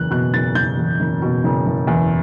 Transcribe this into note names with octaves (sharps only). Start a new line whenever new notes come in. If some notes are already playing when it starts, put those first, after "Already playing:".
Already playing: F#1 E2 F#6
B2 F#6
F#1 A6
F#1 G6
E2
F#1
B2
F#1
F#1
E2